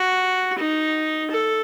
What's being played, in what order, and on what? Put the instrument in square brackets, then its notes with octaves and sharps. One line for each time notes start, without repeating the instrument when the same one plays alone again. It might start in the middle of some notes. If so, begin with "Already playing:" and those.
Already playing: [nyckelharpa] F#4
D#4
A4